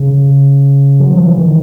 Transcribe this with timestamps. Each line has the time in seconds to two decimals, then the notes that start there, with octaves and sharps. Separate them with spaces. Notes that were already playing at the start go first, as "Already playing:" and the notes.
Already playing: C#3
1.00 F#3
1.13 F3
1.26 E3
1.38 D#3